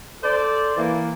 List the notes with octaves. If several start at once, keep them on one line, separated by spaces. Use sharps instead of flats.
A4 C5 D5
E3 A#3